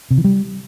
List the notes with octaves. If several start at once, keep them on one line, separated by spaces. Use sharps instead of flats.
C3
E3
G3